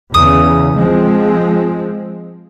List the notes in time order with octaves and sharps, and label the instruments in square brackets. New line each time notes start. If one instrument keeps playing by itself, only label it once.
[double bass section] E2 C#3 [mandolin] D#6
[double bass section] F3 G#3 C4